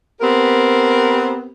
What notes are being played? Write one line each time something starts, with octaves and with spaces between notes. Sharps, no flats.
B3 C4 G4 A#4